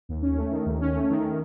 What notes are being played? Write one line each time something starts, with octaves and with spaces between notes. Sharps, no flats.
D#2
C#4
A3
D#3
D#2
C#4
A3
D#3